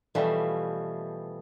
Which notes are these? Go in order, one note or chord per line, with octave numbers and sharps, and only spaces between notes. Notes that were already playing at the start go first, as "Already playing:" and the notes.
B2 E3 F3 G3 A3